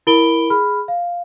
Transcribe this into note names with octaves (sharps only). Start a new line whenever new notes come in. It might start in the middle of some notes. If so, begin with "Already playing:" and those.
E4 A#4 B5 D7 G7
G#4 B5 F6
F5